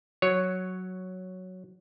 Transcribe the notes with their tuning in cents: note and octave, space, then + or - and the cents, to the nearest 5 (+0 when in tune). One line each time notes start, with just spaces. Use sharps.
F#3 +0 C#5 +0